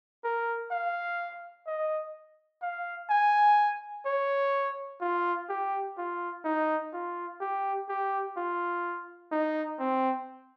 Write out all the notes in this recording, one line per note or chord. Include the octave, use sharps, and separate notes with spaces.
A#4
F5
D#5
F5
G#5
C#5
F4
G4
F4
D#4
F4
G4
G4
F4
D#4
C4